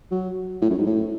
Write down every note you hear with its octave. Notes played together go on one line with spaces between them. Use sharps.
F#3
A2
F#2
G#2
A2